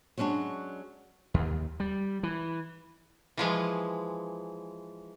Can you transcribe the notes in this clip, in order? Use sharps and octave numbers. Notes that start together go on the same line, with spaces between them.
F#3 G#3 C#4 D4 F#4
D#2
G3
E3
E3 F3 G#3